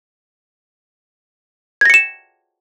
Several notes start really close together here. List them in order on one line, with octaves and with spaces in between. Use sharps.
G#6 A#6 C#7 E7